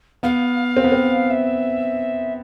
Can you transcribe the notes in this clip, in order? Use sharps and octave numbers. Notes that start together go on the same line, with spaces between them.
B3 F5
C4
B3
C4
E5